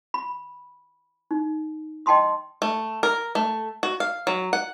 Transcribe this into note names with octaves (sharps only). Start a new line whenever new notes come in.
B5
D#4
D#5 G5 A5 C6 D#6
A3
A#4
A3
F#4
F5
F#3
F#5